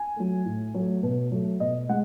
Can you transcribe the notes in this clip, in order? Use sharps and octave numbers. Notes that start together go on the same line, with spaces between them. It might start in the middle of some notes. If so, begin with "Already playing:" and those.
Already playing: G#5
F#3 A3
A2
F#3 A3
B2
F#3 A3
B2 D#5
G#3 F#5